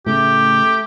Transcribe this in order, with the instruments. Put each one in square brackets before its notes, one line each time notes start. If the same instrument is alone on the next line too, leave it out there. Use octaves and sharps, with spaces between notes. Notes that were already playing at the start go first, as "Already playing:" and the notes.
[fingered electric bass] A2 C#3 [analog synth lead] A3 [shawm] G4